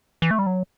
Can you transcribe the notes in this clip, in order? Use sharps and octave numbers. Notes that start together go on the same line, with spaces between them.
E3
A3
G3
F#3